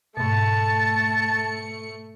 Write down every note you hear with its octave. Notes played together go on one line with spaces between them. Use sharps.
G#2 B2 A3 A5 C#7